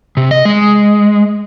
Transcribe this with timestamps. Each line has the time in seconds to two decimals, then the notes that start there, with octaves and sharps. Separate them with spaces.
0.17 C3
0.31 D#5
0.45 G#3